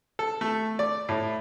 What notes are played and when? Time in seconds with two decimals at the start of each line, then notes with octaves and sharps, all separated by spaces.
0.19 A4
0.41 A3
0.79 D5
1.09 A2